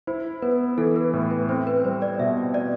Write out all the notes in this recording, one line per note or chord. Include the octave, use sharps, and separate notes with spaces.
E4 C5
B3 B4
E3 A4
B4
A2
B4
C4 C5
B4
G3 C5
D5
B2 E5
D5